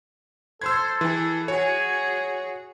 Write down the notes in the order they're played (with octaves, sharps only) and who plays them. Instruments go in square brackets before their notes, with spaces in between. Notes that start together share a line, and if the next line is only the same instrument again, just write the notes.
[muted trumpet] A4 [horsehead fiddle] C5 [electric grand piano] E6 G#6
[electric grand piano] E3 [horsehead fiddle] E4 G#4
[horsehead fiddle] F#4 G#4 [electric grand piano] C#5 [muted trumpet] G#5